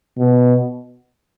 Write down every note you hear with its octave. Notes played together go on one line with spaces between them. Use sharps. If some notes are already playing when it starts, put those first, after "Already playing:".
B2